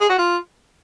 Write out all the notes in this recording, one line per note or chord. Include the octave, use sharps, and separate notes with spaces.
G#4
F#4
F4